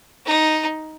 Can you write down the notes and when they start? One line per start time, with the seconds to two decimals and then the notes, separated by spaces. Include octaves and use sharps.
0.26 D#4